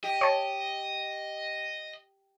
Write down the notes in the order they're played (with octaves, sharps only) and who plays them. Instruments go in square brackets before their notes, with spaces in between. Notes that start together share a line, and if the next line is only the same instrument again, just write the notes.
[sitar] G4 [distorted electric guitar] D#5
[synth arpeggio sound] C#5 A5